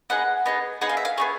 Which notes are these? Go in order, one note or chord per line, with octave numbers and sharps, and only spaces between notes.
B3 D#4 G#4 F#5
B3 D#4 G#4
B3 D#4 G#4 F#5
F5
E5
F5
B3 D#4 G#4 C#5